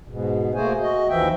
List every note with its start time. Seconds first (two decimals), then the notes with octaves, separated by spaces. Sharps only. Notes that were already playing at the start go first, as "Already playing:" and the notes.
0.08 G#2 B2
0.55 A3 A#3 F#4 G#4 C5 G#5
0.81 F#4 D#5
1.09 D#2 E3 F3 E5 G5